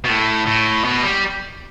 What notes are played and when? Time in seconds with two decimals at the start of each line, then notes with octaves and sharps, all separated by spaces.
0.04 B2
0.09 A2
0.47 A2
0.84 B2
1.03 G3